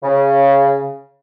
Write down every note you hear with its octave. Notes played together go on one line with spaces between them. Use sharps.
C#3